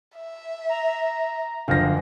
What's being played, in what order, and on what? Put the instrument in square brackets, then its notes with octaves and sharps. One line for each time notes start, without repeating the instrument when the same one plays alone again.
[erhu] E5
[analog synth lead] A#5
[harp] F#1 [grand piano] D3 F3 A#6 [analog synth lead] F5